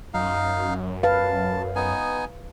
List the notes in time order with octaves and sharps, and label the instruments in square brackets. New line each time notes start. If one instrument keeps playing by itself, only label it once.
[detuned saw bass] F#2 [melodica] D#4 F5
[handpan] B4 F5 [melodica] A5
[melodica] B3 D#4 G#5